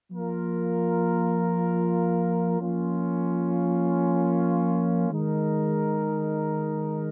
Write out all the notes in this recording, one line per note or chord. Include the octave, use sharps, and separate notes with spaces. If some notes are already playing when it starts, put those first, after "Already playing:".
F3 A#3 F4 A#4
F3 A#3 C#4 F4
D#3 G#3 D#4 A#4